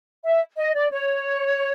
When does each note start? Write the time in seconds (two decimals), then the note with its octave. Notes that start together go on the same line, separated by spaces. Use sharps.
0.25 E5
0.58 D#5
0.74 D5
0.92 C#5